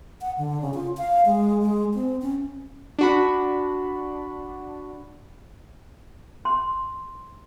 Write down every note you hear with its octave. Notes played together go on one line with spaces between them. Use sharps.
F#5
D3
C#3
F4
F5
G#3
G#3
C4
C#4
D4 F#4 B5
C6